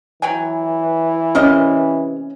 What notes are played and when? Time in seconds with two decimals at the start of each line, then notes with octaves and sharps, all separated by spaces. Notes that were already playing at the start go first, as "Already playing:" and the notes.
0.22 E3 F#3 G5 G#5
1.35 C3 A#3 C#4 D#5